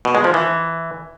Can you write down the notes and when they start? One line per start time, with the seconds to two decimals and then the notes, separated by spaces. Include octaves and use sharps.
0.05 B2
0.15 G#3
0.24 F3
0.34 E3